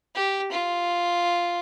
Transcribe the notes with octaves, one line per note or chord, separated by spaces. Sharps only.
G4
F4